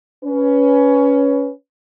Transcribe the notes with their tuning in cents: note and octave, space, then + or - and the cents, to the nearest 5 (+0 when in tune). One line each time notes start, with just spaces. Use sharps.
C#4 +15 B4 +0